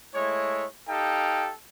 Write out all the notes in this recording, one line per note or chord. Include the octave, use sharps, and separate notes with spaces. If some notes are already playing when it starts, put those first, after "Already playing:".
G#3 A3 E4 C#5
D#4 G4 A4 F5 G5